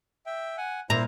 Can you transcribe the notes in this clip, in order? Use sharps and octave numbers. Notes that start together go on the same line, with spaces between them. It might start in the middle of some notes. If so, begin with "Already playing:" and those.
E5 G5
F#5 G#5
A#2 E4 C5 A#5